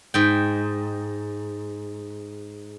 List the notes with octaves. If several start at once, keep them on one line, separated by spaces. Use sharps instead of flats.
G#2 G5